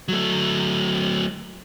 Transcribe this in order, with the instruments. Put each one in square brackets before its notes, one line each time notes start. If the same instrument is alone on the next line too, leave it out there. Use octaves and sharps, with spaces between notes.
[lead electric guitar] F#3 A3